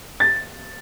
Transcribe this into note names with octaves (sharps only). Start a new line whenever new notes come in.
A6